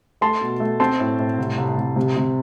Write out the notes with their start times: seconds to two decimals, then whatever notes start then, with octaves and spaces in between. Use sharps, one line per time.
0.21 A3 A5 C6
0.41 B2
0.60 A3
0.80 C4 A5 C6
1.00 A2
1.19 A2
1.38 C2
1.58 C2
1.77 C2
1.96 C3
2.16 C3